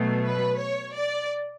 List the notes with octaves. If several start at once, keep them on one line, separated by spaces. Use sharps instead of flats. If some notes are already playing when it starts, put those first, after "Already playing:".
Already playing: B2 F#3 A3
B4
C#5
D5